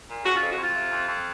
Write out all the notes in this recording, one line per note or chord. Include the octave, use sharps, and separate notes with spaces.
A#2
C#3 F#4
F2 F4
F#4
F2 F4
C3
F2
F2